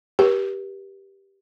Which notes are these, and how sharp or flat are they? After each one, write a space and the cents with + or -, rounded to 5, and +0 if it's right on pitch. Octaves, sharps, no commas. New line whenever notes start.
G4 +0 B4 -45